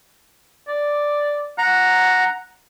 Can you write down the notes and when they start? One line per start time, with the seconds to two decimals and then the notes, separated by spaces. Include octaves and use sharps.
0.68 D5
1.58 F#5 A#5